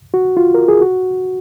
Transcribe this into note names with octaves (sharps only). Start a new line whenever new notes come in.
F#4
F4
A#4
G#4
F#4